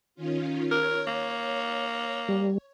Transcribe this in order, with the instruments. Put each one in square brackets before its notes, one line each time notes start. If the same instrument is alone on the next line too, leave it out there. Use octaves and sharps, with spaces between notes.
[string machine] D#3 C#4 F4
[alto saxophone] A#4 [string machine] C#5
[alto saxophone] A#3
[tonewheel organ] G3